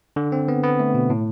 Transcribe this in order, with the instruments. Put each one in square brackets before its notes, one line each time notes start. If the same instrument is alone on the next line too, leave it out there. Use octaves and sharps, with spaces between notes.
[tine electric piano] D3
C4
B3
B3
A3
B2
A2